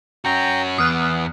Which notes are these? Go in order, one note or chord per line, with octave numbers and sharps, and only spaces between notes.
C#4 F#4 G5 A#5
E2 B3 D#6 F6 F#6